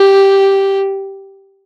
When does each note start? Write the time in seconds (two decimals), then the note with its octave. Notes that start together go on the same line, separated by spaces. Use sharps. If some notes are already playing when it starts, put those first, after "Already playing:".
Already playing: G4